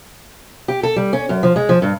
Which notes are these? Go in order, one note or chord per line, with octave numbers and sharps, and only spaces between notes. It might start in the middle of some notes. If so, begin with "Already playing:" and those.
G4
A4
G3
C#4
F#2
F3
G#3
F3
G2